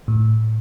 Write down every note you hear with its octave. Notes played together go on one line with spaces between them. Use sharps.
A2